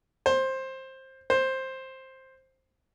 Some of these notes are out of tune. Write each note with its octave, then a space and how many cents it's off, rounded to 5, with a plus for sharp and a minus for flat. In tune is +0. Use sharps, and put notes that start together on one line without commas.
C5 +15
C5 +10